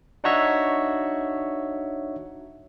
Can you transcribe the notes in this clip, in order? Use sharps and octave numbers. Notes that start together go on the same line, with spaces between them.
D4 D#4 F#4 C#5 E5